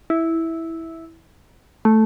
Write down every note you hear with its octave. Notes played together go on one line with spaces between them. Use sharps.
E4
A3